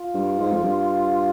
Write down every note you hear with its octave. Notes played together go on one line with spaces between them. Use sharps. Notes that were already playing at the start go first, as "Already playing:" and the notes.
Already playing: F4
G2
G#2
F2
G2